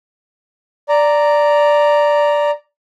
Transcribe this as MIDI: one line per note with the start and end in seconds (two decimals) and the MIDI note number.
0.89 2.51 74
0.89 2.51 82